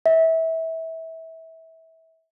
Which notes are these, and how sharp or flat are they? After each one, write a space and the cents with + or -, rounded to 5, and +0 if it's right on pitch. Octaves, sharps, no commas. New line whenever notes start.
E5 -25